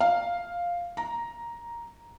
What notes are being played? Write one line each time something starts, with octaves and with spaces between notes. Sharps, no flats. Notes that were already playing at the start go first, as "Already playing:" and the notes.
F5
A#5